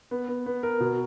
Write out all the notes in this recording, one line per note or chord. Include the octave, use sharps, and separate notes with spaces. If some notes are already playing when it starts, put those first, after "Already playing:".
B3
B3
B3
A#4
B2